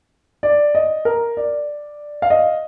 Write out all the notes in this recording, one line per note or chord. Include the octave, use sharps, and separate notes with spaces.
D5
D#5
A#4
D5
F5
D#5